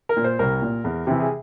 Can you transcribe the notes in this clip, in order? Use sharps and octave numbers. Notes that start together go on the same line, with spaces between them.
A#4
A#2
C5
C2 A#4
A#2
E2
C3 E3
G#4